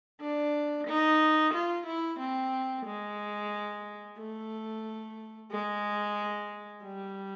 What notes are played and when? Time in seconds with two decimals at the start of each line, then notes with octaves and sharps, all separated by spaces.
0.21 D4
0.87 D#4
1.54 F4
1.86 E4
2.19 C4
2.86 G#3
4.18 A3
5.51 G#3
6.84 G3